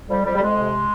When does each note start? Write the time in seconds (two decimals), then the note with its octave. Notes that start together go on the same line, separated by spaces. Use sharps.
0.09 F2 G3
0.24 F2 G3
0.35 G3
0.40 F2 G#3
0.56 C3